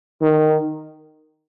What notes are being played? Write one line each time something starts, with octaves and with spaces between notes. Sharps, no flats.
D#3